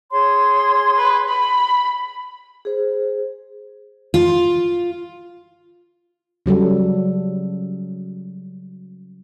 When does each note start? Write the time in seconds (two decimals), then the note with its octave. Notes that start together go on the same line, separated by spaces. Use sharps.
0.11 G#4 C#5 C6
0.98 B4
1.28 B5
2.65 G#4 C5
4.14 F4
6.46 C#3 F#3 G3 A4